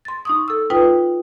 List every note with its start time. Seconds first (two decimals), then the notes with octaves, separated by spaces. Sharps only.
0.05 C6 A6
0.25 D#4 C#6 D#6
0.48 A4 E6
0.70 D#4 F4 B4 G5